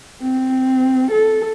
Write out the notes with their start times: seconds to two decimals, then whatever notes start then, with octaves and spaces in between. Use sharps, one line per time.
0.22 C4
1.11 A4